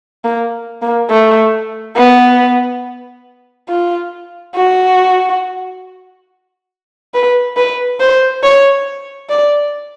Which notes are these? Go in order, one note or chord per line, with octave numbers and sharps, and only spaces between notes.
A#3
A#3
A3
B3
F4
F#4
B4
B4
C5
C#5
D5